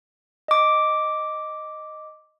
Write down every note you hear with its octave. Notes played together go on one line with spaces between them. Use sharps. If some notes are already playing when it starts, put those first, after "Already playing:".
D#5 D6